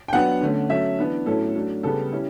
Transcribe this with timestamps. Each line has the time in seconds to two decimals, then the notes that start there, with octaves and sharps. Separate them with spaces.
0.08 G5
0.13 F#3 B3 D4 F#5
0.41 D3 A3 C#4
0.70 F#3 A3 C#4 E5
0.99 E3 B3 D4
1.26 A2 F#3 C#4 E4 A4
1.56 F#3 A3 D4
1.83 C#3 G3 B3 A4
2.12 G3 C#4 E4